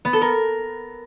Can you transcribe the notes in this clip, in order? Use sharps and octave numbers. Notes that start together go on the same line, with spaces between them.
B3
A4
A#4